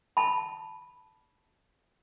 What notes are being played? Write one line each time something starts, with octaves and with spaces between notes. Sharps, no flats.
A5 B5